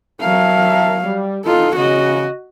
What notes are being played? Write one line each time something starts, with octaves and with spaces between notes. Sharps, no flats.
F#3 A#4 E5 F5 A5
G3
D#4 F4 A4
C#3 F#4 D#5